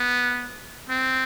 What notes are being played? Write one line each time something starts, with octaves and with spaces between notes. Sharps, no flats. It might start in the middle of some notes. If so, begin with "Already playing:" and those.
Already playing: B3
C4